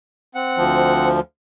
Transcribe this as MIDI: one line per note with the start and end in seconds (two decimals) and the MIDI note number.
0.35 1.08 60
0.35 1.08 78
0.57 1.20 38
0.57 1.20 53